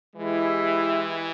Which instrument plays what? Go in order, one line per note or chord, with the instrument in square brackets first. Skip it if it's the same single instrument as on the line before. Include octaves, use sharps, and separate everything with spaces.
[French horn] E3 [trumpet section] G#3 E4 G4